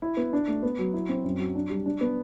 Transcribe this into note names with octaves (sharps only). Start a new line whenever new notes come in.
E4
B3
D4
A3
B3
F#3
E4
C4
F#2
F#3
D4
G3
D4
B3